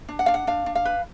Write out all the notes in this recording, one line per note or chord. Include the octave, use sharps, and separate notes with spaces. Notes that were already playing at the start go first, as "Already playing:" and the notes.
D4
F#5
D4 F5
F#5
D4 F5
D4
F5
B4